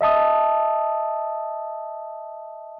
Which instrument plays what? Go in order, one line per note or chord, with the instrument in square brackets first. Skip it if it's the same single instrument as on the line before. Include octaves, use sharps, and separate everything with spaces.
[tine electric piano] D#5 E5 A5 D#6